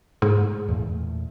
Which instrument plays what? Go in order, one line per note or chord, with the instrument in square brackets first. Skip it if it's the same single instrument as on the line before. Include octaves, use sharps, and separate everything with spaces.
[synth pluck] G#2
[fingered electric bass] E2 A#2 A3